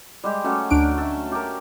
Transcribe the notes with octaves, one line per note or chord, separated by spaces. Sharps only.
G3 G#3 G4
F#3 A3 C#4
D2 D4 D7
A4 E5
G4 A#4